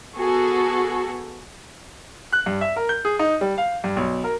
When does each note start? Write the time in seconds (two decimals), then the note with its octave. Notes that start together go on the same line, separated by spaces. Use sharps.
0.15 B3 F#4 G#4 A4
2.33 F#6
2.46 G2
2.61 E5
2.76 A#4
2.89 G6
3.05 G#4
3.19 D#4
3.41 G3
3.58 F5
3.84 G2
3.96 B1
4.24 A#4